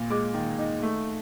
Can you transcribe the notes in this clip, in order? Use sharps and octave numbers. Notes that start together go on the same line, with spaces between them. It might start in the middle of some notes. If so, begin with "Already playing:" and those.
Already playing: A#2
G#3 D6
D#3
D#4
A3